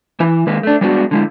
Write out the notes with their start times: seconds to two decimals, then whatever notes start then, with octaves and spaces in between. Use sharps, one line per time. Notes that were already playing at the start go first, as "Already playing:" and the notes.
0.20 E3 E4
0.47 D#3 G#3 A#3 B4
0.63 A3 D4
0.81 G3 G#3 B3 D4 F#4
1.11 D3 G#3 E4